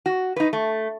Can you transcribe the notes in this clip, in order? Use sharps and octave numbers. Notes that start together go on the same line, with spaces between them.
F#4
D#4 B4
A3